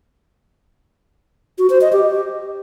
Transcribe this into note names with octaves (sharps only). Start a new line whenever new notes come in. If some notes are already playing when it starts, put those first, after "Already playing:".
F#4
C5
D#5
G4